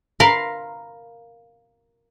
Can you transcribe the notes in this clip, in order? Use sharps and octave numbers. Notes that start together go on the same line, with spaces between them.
A#4 F5 B5 C6